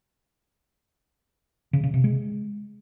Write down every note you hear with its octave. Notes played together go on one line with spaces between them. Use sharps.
C#3
C#3
C3
G#3